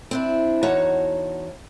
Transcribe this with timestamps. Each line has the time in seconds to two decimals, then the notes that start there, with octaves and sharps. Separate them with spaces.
0.11 C4 D4 E4
0.63 E2 D#4 F#4 C#5 A5 A#5